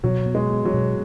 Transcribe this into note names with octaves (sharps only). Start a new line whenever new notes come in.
B2 F#3
B3
G#3
B3
F#3
B2